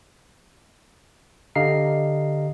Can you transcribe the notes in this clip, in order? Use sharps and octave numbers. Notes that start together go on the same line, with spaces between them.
D3 G4 D#5 F5 A#5 C7